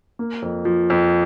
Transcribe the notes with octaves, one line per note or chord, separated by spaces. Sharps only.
A#3
F2
F3
F2